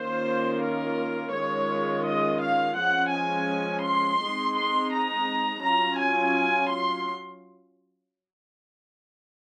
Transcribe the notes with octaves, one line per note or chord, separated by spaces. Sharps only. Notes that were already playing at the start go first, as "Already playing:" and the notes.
Already playing: D#3 A#3 C#4 F4 C5
A#4
D#3 G#3 C#4 F4 C#5
D#5
F5
F3 G#3 C#4 F#5
G#5
C6
G#3 C4 D#4
C6
A#5
F#3 C#4 F4 A#5
G#5
C6